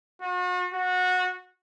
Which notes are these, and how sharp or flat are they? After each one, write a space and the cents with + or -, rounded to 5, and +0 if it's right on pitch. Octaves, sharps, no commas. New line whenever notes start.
F#4 -40
F#4 -20